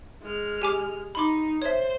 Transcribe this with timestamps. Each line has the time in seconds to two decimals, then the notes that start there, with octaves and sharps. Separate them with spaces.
0.23 G#3 F6
0.62 G4 G#5 D6
1.15 D#4 B5 C6 D6
1.62 C5 C#5 E5